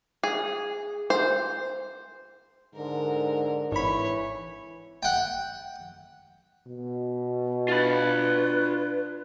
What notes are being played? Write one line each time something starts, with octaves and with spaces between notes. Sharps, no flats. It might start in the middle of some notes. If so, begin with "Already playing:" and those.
G#4
C5
G#2 D3 A#4
G#1 E3 C#5 B5
F#5 G5
B2
D4 F4 B4 B5